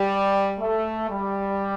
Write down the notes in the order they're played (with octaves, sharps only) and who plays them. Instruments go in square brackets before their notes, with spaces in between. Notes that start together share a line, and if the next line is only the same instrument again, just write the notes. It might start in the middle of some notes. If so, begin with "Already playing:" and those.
Already playing: [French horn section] G3
A3
G3